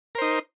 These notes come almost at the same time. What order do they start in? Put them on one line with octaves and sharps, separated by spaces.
A#4 C5 D#4